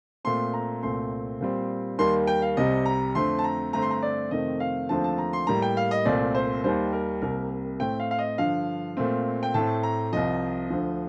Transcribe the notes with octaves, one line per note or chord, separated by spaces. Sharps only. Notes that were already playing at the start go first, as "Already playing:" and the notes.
A#2 A3 C4 C6
A#5
C2 A#2 A3 C4 C6
A#2 G3 C4
D#2 D#3 G3 A#3 C6
G5
F5
C2 C3 G3 D#5
A#5
F2 D3 A3 C4 C6
A5
A#5
G2 D3 A3 C4 A#5
C6
A#5
D5
F2 C3 D#3 A3 C4 D#5
F5
D#2 D3 F3 A3 C4 A5
A5
A#5
C6
A2 G3 A#3 A#5
G5
F5
D#5
C2 A#2 A3 C4 D5
C5
D#2 D#3 G3 C5
A#4
C2 C3 G3 A#3 A#4
A2 A3 C4 G5
F5
F5
D#5
G2 D3 F3 F5
A#2 A3 C4
G5
A2 A3 C4 A5
A#5
C2 C3 F3 D#5
D2 D3 F3